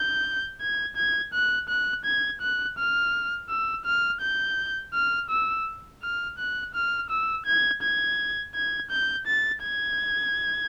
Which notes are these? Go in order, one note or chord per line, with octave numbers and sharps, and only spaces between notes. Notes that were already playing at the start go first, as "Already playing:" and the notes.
Already playing: G6
G#6
G#6
F#6
F#6
G#6
F#6
F6
E6
F6
G6
F6
E6
F6
F#6
F6
E6
G#6
G#6
G#6
G6
A6
G#6